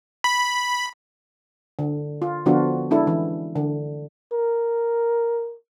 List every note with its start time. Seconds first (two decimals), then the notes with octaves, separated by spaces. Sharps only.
0.24 B5
1.79 D3
2.22 F4
2.46 D3 F3 B3 D4 F4 F#4
2.91 G#3 D4 E4 A4
3.07 E3 C#4
3.56 D3
4.33 A#4